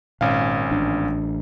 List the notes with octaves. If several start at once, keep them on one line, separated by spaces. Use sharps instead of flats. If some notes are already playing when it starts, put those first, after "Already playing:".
G#1 A#2 C#4 F5
A1 D4